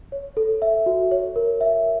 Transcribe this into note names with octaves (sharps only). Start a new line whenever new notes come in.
C#5
A4
E5
F#4
C#5
A#4
E5